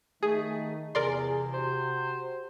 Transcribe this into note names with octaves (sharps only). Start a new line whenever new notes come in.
D#3 A3 D#4 G#4
E2 C3 G#4 A#4 D5 C6
F#4 G4 C5